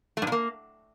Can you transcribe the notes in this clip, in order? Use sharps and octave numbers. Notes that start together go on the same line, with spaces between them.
A3
G2
A#2
A#3